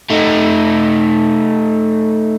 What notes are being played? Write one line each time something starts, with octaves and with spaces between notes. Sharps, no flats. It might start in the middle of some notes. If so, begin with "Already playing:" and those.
A3 D#4